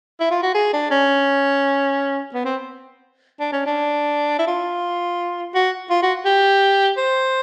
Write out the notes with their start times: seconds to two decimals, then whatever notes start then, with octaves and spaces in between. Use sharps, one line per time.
0.20 E4
0.31 F4
0.43 F#4
0.55 G#4
0.73 D4
0.91 C#4
2.34 B3
2.45 C4
3.40 D4
3.53 C#4
3.66 D4
4.39 E4
4.47 F4
5.55 F#4
5.90 F4
6.03 F#4
6.25 G4
6.97 C5